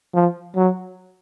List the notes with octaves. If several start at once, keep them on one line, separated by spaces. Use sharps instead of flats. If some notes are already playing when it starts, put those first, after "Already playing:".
F3
F#3